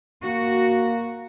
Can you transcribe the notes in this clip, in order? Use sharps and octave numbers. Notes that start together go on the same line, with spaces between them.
A#3 F#4